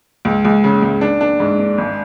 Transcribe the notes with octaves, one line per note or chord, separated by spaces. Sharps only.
C#2
C#2
C#3
C#2
D4
D4
G#2
D4
G#1